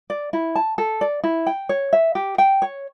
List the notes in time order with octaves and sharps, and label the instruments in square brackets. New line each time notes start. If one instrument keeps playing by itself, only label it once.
[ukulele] D5
E4
A5
A4
D5
E4
G5
C#5
E5
G4
G5
C#5